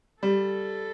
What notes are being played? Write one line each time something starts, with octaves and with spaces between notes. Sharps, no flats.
G3 A4